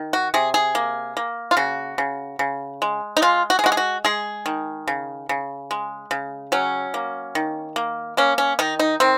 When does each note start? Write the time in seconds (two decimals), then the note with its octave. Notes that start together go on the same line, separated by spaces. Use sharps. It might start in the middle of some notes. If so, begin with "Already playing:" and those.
Already playing: D#3
0.13 F#4
0.34 C3 G#4
0.54 G#4
0.75 A#3
1.17 A#3
1.51 F4
1.57 C#3 F#4
1.98 C#3
2.39 C#3
2.82 G#3
3.17 D#4
3.22 G#3 F4
3.50 F#4
3.59 G#4
3.64 G#3 F#4
3.72 G#4
3.77 F#4
4.05 G#3 G#4
4.46 D#3
4.88 C#3
5.29 C#3
5.71 G#3
6.11 C#3
6.52 F#3 C#4
6.94 A#3
7.35 D#3
7.76 A#3
8.17 A#3 C#4
8.38 C#4
8.59 D#3 D#4
8.79 D#4
9.00 D#3 C4